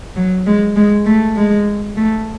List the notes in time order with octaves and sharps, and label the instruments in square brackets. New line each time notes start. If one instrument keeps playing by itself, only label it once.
[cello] F#3
G#3
G#3
A3
G#3
A3